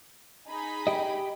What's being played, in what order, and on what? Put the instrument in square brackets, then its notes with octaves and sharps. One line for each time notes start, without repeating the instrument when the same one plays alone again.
[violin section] D#4 G#4 B5
[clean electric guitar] G4 D#5